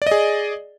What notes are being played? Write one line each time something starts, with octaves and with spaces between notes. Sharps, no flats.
G#4 D5 D#5